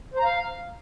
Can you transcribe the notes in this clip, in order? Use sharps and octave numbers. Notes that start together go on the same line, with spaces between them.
C5
A#5
F5